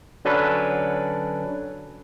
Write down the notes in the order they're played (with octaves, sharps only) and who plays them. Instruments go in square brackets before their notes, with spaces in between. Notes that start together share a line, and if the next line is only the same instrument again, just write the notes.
[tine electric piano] D3 F#3 C#4 D4 A4 B4